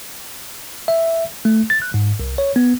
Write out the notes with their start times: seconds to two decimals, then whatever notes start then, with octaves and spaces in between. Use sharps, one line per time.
0.88 E5
1.45 A3
1.70 A6
1.82 F#6
1.94 G#2
2.20 C2
2.38 C#5
2.56 B3